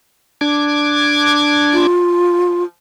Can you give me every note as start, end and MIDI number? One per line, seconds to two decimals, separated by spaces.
0.41 1.87 62
0.41 1.87 86
0.41 1.87 92
1.73 2.63 65